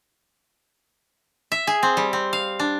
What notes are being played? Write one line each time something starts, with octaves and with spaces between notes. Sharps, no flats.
E5
G#4
C4
G3
C4
F5
D4